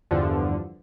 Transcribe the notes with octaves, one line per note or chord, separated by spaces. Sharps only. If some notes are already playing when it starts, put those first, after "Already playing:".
E2 G2 D3 F3